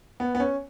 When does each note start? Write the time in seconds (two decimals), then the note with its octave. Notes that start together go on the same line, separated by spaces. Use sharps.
0.20 B3
0.35 B3
0.40 C#4